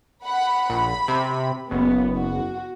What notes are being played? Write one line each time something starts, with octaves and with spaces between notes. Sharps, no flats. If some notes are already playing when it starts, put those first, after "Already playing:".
F#5 B5
A#1 B5
C3
F#1 B3
F#4